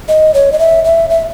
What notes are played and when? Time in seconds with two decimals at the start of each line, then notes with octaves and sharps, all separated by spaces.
0.09 D#5
0.34 C#5
0.52 D#5
0.59 E5
0.85 E5
1.10 E5